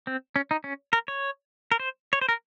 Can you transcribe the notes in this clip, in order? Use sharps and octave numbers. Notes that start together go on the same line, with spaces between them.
C4
C#4
D#4
C#4
A#4
C#5
A#4
C5
C#5
C5
A#4